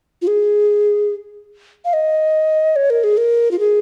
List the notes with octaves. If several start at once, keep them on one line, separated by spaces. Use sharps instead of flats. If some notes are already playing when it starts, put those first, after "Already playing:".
F4
G#4
F5
D#5
C#5
A#4
G#4
A#4
F4
G#4